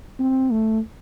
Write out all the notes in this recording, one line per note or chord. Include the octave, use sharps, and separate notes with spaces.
C4
A3